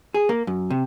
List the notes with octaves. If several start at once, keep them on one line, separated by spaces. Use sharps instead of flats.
G#4
A#3
F#2
C3